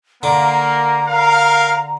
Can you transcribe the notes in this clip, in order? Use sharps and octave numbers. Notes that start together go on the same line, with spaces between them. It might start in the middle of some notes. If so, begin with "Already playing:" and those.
D3 A#3 A#5 D6
A#4 F5